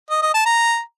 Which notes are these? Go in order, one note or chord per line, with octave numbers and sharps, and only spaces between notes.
D#5
D#5
A5
A#5